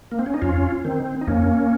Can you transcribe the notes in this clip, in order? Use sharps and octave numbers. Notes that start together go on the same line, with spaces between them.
A#3
C4
C#4
D#4
F2 C#4 F4
D#3 C4
D#4
F2 A#3 C#4